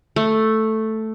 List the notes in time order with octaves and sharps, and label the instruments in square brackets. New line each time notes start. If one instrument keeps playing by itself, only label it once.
[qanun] A3